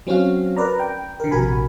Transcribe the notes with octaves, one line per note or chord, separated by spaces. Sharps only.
F#3 C4 C#4 F#4 F5
A#4 B4 D5 A#5
G5
D3 A#4
A#1 C3 F#4 A#4 G#5 B5